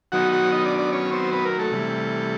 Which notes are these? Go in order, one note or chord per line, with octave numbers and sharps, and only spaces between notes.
D#3 F#3 B3 D#4 F#4 F#5
F#4 F#5
D#4 D#5
D4 D5
D4 D5
C#4 C#5
C4 C5
B3 B4
A#3 A#4
A3 A4
C3 E3 G3